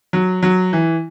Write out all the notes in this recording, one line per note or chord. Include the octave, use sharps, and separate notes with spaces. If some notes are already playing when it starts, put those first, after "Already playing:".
F#3
F#3
E3